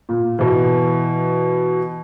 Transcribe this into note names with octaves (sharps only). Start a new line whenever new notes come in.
A#2
B2 E3